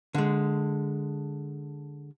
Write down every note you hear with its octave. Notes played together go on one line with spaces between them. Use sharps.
D3 G#3